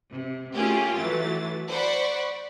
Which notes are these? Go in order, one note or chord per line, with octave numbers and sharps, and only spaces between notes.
C3
A3 A#3 C#4 F4 G4 G#4
E3 F#3 A3 A6
C5 D5 F#5 B5 C#6